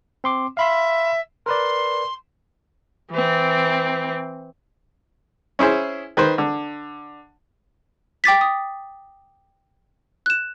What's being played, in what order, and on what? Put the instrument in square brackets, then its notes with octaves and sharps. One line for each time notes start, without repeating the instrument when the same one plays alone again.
[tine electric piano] C4 C6 D6
[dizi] E5 [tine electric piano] F5 B5 C6
[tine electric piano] A#4 B4 D5 [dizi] C6
[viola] E3 C4
[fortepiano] C#4 E4 G#4 C5
D#3 B4 C5
D3
[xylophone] G5 D6 A6 B6
D#6
F#6 E7